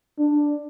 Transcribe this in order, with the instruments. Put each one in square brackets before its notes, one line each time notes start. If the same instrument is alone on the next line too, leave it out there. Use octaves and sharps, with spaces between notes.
[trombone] D4